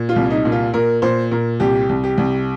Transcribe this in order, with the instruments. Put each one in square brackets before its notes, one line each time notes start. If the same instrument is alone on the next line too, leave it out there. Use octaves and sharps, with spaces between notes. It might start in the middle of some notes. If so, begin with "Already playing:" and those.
Already playing: [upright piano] A#2
F4
C2
D#4
A#2
F4
A#2 A#4
A#2 C5
A#2 A#4
C2 G4
C2
G4
C2